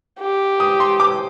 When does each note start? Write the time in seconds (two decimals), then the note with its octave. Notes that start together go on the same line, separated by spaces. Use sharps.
0.20 G4
0.60 D#6
0.80 C6
1.00 D6